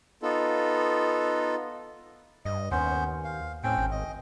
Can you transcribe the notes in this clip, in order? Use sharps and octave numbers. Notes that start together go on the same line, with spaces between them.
B3 D#4 F4 A4
G2 D#5
D#2 B3 C#4 C5
F5
A2 C4 C#4 G5
G#1
D#5